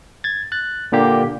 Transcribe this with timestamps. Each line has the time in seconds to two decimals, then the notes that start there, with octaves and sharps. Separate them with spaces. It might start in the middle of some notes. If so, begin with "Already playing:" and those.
0.24 G#6 A6
0.52 F#6 A6
0.92 A#2 D3 A#3 G4